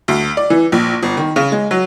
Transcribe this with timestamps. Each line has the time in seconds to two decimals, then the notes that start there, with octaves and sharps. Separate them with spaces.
0.08 D2
0.37 D5
0.50 E3
0.72 A#1
1.03 G1
1.17 D#3
1.36 C#3
1.52 G#3
1.71 F#3